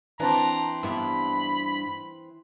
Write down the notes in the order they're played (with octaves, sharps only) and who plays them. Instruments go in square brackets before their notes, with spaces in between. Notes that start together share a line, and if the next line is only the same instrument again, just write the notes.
[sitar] E3 C4 [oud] D4 [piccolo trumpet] A#5
[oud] G2 B3 E4 [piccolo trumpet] B5